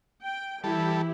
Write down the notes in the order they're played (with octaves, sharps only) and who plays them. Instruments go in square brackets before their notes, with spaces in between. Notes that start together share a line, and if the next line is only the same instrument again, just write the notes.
[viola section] G5
[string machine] E3 [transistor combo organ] G3 A4 [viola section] E4 G4